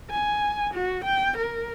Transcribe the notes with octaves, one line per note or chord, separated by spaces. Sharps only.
G#5
F#4
G5
A#4